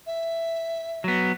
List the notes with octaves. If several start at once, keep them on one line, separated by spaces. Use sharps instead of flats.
E5
F#3 B3